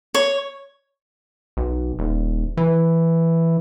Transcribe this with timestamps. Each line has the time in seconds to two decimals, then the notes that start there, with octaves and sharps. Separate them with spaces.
0.15 C#5
1.57 B1
1.99 D#1
2.57 E3